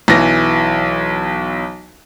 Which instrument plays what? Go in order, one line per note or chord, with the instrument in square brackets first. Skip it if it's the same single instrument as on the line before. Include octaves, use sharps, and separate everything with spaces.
[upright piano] B1 E3 A#6